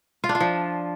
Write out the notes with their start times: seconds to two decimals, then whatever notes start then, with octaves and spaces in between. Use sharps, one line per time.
0.24 F4
0.29 D4
0.35 F4
0.40 F3